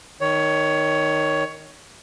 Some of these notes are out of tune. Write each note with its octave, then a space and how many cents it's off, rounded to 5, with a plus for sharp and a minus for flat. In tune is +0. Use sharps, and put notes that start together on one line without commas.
D#3 +0 C#5 +15